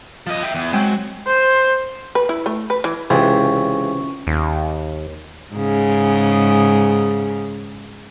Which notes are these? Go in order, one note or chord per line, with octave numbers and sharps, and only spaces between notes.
F3 D#5
E5 G5
E2
F#3 G#3 C4 G5
C5
B4
E4
A3
B4
E3
C#2 C3 E3 C4 C#4 C#6
D#2
G#2 C#3